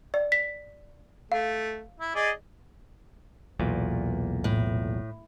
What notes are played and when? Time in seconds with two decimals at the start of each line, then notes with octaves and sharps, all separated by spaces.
0.14 D5
0.32 B6
1.32 A3 F5
2.00 E4
2.15 G#4 D5 D#5
3.59 B1 E2 A#2
4.44 A2